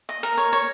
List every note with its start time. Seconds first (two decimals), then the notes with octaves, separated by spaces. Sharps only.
0.09 D#5
0.23 A#4
0.37 C#5
0.53 C#5